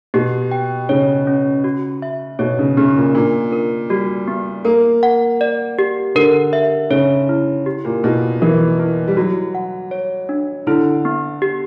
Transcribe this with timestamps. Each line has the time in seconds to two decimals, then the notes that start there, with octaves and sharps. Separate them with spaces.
0.14 B2 G4
0.52 G5
0.89 C#3 C#5
1.27 C#4
1.64 F#4
2.02 E5
2.39 B2 C#5
2.59 C#3
2.77 C#3 B3
2.96 A#2
3.15 A#2 D4
3.52 A#4
3.90 G3 F#4
4.28 B3
4.65 A#3 A#4
5.03 F#5
5.41 D5
5.79 G4
6.15 D3 A#4
6.53 E5
6.90 C#3 C#5
7.29 E4
7.66 G4
7.85 A#2
8.04 B2 E4
8.42 E3 A#4
8.79 E4
9.08 G3
9.17 F#3 F#4
9.55 F#5
9.91 C#5
10.29 D4
10.67 D3 E4
11.05 B3
11.42 G4